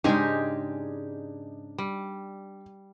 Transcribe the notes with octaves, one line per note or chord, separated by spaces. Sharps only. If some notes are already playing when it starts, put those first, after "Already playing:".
G#2 C#3 G#3 D4 D#4 G4 G#5
G3